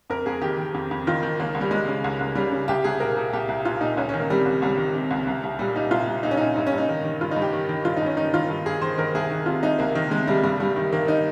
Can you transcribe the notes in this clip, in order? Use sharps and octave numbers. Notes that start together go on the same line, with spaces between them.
F2 A#4
F2 G#4
D#3 G4
D#3
F2
F2
D#3 F4
D#3
C#2 A#3
C#2
G3
C#3 G#3
C#3
C#2
C#2
C#3 G3
C#3
C2 G4
C2 G#4
A#2 A#4
A#2
C2 G4
C2
A#2 F4
A#2 D#4
C#2 C#4
C#4
D#3
A#3
C3 G3
C#2
C#2 G3
D#3
C3
C#2
C2
C2
A#2 G3
A#2 D#4
C2 F4
C2
A#2 D#4
C#4
A#2 D#4
G2 D#4
C#4
G2
D#4
D#3
D#3
G2 F4
D#4
G2
G4
D#3
D#3
G2 F4
D#4
G2
C#4
D#3 D#4
D#3 F4
G2
G2 G#4
D#3 C5
D#3 A#4
C2 G#4
D#3
C3 F4
C2 D#4
C2 A#3
D#3
C3 G#3
C2 G3
G2 G3
G2 G3
D#3
D#3 A#3
D#4